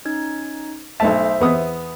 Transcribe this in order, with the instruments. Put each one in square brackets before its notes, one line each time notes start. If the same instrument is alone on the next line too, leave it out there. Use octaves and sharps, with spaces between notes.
[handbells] C#4 D#4 G#6
[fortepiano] B1 A3 A5 [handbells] C5 E5
[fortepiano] E2 B3 D#6